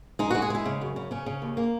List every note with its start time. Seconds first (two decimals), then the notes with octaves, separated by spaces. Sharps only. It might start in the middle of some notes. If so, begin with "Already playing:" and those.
0.19 G#3 D#4
0.31 G#3 F#4
0.42 G#4
0.50 G#3 E4
0.66 C#3
0.81 F#2
0.96 C#3
1.11 C#3 C#4
1.26 C#3
1.42 D#2
1.57 A#3